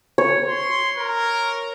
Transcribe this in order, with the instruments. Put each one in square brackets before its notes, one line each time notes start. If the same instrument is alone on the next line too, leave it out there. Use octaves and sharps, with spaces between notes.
[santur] C#5
[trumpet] C6
A#4